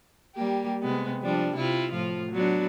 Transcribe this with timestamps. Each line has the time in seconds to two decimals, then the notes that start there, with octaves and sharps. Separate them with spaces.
0.35 G3 A#3 G4
0.82 C3 G#3 B3
1.22 F3 G3 D4
1.56 C3 E4 F4
1.92 A2 F3 F4
2.31 F#3 B3 D4